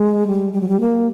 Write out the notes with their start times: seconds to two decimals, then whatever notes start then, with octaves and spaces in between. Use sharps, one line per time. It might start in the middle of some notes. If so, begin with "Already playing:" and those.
Already playing: G#3
0.27 G3
0.53 G3
0.61 F#3
0.69 G3
0.80 A#3